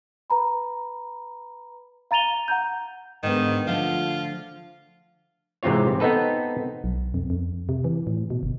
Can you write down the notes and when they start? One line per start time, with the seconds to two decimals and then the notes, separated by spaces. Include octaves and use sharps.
0.30 B4 A#5 B5
2.11 F5 A#5 A6 D#7 F7 G7
2.48 F#5 A#5 G6
3.23 G#2 D3 D#3 B3
3.67 D3 F3 A3 F4
5.63 G#2 C3 E3 C4 F4 C#5
6.00 B3 C4 D#4 A4 B4
6.84 B1
7.14 F2
7.30 F2
7.69 C3
7.84 E3
8.07 A2
8.30 B2
8.43 G1